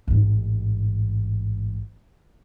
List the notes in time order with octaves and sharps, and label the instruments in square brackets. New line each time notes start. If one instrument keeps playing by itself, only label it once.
[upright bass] A1 G#2